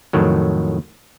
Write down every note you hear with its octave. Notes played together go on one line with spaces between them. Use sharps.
F2 A2 D#3 F#3